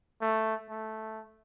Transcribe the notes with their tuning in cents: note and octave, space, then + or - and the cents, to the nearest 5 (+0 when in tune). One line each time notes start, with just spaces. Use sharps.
A3 +5
A3 -5